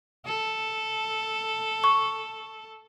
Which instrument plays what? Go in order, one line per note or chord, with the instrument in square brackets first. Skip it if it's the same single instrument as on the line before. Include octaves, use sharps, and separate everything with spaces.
[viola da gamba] A4
[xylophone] C#6